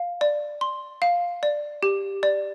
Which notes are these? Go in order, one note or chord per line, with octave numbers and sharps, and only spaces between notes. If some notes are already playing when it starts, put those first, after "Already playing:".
Already playing: F5
D5
C6
F5
D5
G4
D5